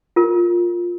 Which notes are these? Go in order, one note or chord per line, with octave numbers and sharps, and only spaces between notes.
F4 A#4